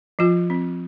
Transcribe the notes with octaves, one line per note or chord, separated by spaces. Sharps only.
F3 F4
C4